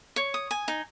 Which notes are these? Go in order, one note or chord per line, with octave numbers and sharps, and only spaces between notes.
C#5
D#6
G#5
D#4